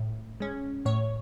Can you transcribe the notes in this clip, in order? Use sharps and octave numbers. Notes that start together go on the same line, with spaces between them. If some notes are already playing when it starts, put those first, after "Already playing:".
Already playing: A2
G#3 C#4
A2 C#5